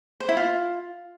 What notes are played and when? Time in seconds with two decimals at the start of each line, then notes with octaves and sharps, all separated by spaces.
0.20 C5
0.29 E4
0.37 F4